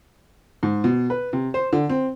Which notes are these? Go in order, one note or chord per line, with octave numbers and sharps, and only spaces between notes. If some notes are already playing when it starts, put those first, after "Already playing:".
G#2
B2
B4
C3
C5
D3
C4